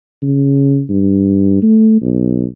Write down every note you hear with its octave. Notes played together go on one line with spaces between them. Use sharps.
C#3
G2
A3
B1